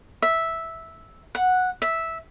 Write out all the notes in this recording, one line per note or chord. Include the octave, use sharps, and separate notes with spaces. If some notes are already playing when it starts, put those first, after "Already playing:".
E5
F#5
E5